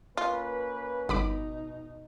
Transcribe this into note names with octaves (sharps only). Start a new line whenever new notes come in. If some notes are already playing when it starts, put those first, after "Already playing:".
A#3 C#4 F4 B4
G1 B2 B3 D#4 B5 D6